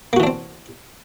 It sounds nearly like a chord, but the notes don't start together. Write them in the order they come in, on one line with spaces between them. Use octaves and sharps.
A#3 F#4 E3 D4 C4